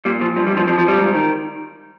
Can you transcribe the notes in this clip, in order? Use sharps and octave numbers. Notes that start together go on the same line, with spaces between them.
A#2 G3
A#2 F3
G2 F3
G3
G2 F3
F2 F3
F3
F2 G3
G#2
D#3